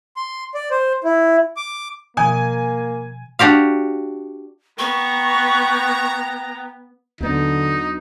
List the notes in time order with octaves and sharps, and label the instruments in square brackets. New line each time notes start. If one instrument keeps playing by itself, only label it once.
[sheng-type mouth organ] C6
D5
C5
E4
D6
[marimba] B2 D#3 F3 [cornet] A#3 [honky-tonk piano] G#5
[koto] D4 F#4 G4 F5
[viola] B3 [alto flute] G5 [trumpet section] A#5 [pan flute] C#6
[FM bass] D#2 [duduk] D3 [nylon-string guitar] F#3 B3 D4 [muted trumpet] D#4